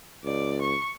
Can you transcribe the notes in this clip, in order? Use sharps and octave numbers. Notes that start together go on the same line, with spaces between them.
C#2 D5
C#6